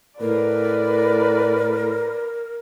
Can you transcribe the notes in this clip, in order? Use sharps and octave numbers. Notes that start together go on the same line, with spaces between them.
A2 A#4 B4 D5